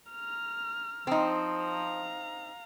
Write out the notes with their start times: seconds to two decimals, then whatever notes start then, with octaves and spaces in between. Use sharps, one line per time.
0.11 A#5 F6
1.07 F3 C4 D#4
1.62 F5 A#5